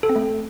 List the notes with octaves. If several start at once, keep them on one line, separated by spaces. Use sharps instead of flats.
A4
C4
A3